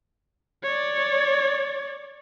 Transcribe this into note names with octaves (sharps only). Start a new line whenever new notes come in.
C#5 D5